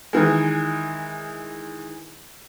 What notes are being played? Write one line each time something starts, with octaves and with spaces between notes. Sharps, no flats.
D#3 E3 G#3